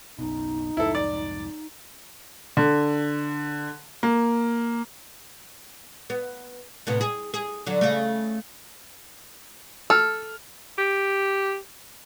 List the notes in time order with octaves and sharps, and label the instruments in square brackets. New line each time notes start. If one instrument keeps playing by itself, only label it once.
[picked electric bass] F#1 B1 B2 [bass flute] D#4
[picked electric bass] C2 F2 G#2 [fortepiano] E4 A4
[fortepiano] D5
[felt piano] D3
A#3
[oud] B3
A2 C3 B3
G#4
G#4
D3 F#3
C#3 A3
[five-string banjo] A4 [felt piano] F6
[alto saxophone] G4